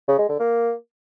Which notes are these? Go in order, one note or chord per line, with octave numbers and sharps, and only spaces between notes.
C#3
G#3
D3
A#3